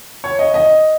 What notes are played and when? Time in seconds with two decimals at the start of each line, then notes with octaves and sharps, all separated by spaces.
0.24 C#5
0.39 D#5
0.54 D#5